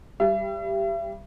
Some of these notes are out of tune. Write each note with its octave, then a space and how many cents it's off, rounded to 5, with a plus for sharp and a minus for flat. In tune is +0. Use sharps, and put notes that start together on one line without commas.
G3 +0 E5 +40